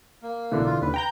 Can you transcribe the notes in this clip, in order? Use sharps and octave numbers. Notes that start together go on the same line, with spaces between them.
A#3
B1 A2 D3 E3
F4
D#2 B4
G5 A#5 G6